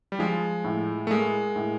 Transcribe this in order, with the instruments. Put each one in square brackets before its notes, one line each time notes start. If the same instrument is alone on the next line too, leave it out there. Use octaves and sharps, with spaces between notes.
[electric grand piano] G3
[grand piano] F3 [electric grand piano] G#3
[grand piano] A2
[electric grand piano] A3
[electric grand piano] G#3 [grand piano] A#3
[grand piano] A2